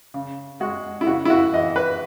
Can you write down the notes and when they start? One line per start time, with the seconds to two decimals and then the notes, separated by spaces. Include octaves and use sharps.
0.14 C#3
0.60 G#3 F#4
1.01 E4
1.07 C#3 F#4
1.25 E4
1.30 F#4
1.54 E3 D#5
1.76 B4